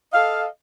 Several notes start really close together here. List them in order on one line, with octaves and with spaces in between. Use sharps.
D#5 F5 A4